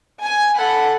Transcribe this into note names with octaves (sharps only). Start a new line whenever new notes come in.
G#5
A4 F#5 B5